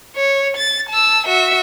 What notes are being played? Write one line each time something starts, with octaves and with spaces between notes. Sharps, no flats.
C#5
A6
A5 E6
F#4 E5